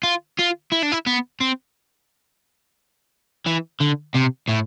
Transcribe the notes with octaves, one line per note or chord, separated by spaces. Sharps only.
F4
F4
E4
D4
E4
B3
C4
E3
D3
C3
A2